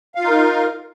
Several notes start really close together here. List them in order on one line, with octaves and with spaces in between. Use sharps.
F5 F4 D#4 A#4